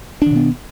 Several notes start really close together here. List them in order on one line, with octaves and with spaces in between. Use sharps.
D4 D#3 B2 B3